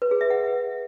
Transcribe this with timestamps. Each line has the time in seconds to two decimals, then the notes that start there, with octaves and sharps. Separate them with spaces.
0.02 B4
0.11 G#4
0.21 E5
0.30 F#5